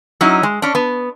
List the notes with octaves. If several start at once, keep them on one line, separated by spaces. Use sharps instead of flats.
F#3 C#4 D#4 E4
G#3
C#4 D4
B3